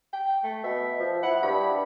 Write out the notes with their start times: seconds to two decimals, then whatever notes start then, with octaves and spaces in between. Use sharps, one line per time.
0.13 G5
0.44 A3
0.64 B2 E5
1.00 F3
1.23 E4 F#5
1.43 G2 B5